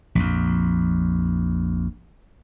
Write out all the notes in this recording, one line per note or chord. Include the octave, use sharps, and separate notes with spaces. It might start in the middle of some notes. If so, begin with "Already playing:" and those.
A#1 F2